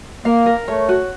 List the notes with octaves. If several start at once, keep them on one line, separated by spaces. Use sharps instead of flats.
A#3 F5
A#4
A3 C#5
F#4